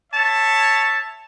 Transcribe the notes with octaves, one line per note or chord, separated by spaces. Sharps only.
C#5 E5 A5